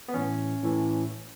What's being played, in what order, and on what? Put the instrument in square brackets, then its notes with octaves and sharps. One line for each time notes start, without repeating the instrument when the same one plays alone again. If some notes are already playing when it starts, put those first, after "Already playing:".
[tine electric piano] B3
A2 E3 C#4
A2 E3